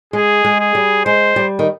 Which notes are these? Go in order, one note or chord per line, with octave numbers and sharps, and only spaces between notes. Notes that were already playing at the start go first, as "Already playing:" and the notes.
G#3 G#4
G#3
G#4
G3
G#3 C5
G3
D#3